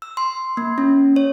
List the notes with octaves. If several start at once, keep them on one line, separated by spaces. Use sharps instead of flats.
E6
C6
A#3
C#4
C#5